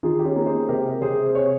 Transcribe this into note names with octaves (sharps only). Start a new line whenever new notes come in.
D#3 F4 G#4
G4
C#4 F4
A#3
G#4 C5
C3 G4 A#4
C3 G#4 C5
C#5